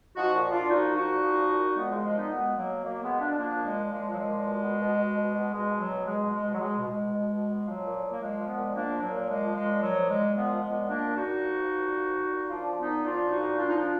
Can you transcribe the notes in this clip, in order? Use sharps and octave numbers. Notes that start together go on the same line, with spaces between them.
F3 D#4 F#4
A#2
A#2 D4 F4
F3 D#4 F#4
F3
D#4 F#4
A#2
F3
A#2
A#2
F3 G#3 B3
G#3
F3
G#3
A#2 B3 D#4
B2 G#3 B3
B2
F#3 A#3
B2
B2 F#3 A#3
B2 G#3 B3
B2 A#3 D4
F3 A#3 D4
A#2
G#3
A#2
F3 G#3
F3 F#3
G#3
A#2
B2
B2
B2
B2
B2
B2
B2 G#3
B2
F#3
B2
B2 G#3
B2
G#3
B2
F#3
B2 G#3
B2
G#3
B2
B2
B2
B2
F3 F#3
A#2
A#2
A#3
F3 G#3
F3
G#3 B3
A#2
F3 A#3 D4
A#2
F#3 A#3
A#2
F3 G#3
F3
G#3
A#2
F3 F#3
A#2
G#3
A#2
F3 G#3 B3
F3
G#3 B3
A#2
F3 A#3 D4
A#2
D#4 F#4
A#2
F3
F3
A#2
F3
A#2
A#2
F3 D4 F4
F3
B3 D#4
A#2
F3 D4 F4
A#2
D#4 F#4
A#2
F3 D4 F4
D#4
F3 D4 F4